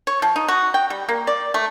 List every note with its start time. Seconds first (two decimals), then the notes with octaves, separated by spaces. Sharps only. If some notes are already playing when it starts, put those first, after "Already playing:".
0.07 C#5
0.22 F3
0.36 D#4
0.48 F#4
0.74 G5
0.90 G3
1.09 A#3
1.27 D5
1.54 A3